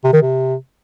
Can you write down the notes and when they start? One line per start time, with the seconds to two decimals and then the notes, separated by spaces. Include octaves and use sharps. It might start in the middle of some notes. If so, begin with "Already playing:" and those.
0.04 C3
0.13 D#3
0.22 C3